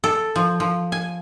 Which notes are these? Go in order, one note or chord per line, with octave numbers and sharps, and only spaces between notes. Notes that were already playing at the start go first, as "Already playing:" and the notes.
A4
F3
F3
G#5